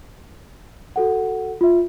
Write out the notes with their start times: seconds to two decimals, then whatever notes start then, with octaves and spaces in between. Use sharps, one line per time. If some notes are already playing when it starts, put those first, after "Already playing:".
0.96 F#4 A4 F#5
1.61 F4 E5